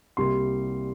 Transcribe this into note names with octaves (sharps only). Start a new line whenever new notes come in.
C2 C3 G3 A#3 C6